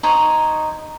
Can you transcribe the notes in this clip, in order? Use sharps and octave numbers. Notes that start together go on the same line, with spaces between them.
D#4 C5 C#5